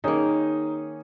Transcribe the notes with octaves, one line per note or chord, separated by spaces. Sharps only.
D#3 A#3 C#4 D#4 G#4